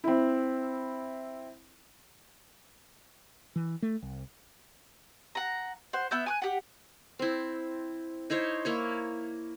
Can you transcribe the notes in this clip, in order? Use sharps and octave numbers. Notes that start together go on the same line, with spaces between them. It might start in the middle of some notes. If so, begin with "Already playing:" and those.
C4 E4
E3
A3
C2
F#5 A#5
C5 F#5
B3 E5 G6
G#5 D6 F#6
G4 F#5
C4 E4
D#4 E4 C5 C#5
A#3 E4 C#5